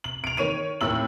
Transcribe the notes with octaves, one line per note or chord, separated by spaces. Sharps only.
F#7
D7 F7
D#3 C#5 D#7 F7
D#2 A2 E6 F#7